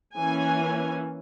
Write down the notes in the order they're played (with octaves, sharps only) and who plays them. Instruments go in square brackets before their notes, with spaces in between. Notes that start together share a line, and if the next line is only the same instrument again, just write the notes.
[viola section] E3 A#3 C#4 G#5